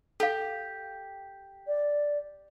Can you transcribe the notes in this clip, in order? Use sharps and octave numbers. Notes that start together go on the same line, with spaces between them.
G4 A4 F5
D5